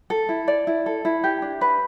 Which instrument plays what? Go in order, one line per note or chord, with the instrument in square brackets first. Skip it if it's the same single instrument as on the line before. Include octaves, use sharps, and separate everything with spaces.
[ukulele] A4
E4
D5
E4
A4
E4
G4
D4
B4